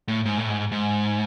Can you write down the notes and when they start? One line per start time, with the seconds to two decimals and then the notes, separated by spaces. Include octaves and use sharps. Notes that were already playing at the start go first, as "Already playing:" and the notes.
0.08 A2
0.25 G#2
0.38 A2
0.48 G#2
0.72 G#2